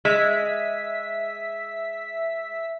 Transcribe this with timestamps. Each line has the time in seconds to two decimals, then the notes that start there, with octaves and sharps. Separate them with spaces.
0.05 G#3 E5 B6